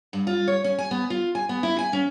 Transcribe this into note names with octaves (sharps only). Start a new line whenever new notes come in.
G2
F4
C#5
C#4
G#5
B3
F4
G#5
B3
E4
G#5
C#4